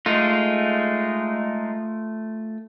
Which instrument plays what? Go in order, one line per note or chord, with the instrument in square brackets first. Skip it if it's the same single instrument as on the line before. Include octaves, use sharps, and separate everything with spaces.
[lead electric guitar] G#3 D#4 [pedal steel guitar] A3 F4